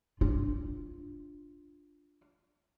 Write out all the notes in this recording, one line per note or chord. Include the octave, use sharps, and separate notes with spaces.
D4 F4